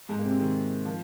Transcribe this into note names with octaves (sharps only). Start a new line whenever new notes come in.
G#2 G#3
A#3
C3 C4
D#3 D#4
F3 F4